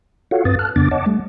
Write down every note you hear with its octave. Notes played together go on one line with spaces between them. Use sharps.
F4 F#4 A4 C#5 F5 F#5
G2 C4 B4 D#6 A6
A5 F6 F#6
F2 C#3 B3 D4 D6 A6
C#5 D#5 F#5 A5 D6
G3 A3